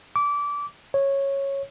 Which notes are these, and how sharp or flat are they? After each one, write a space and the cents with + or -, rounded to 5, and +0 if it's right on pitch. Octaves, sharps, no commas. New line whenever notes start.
D6 -20
C#5 -10